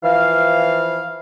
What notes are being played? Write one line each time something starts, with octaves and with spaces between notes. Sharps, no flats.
E3 F3 F5